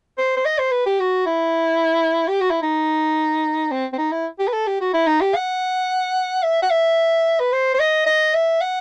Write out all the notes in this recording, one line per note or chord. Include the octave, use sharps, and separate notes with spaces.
C5
C5
D#5
C5
B4
G4
F#4
E4
G4
F#4
E4
D#4
C4
C4
D#4
E4
G4
B4
A4
G4
F#4
E4
D#4
G4
F#5
E5
F#5
E5
B4
C5
C5
D#5
D#5
E5
F#5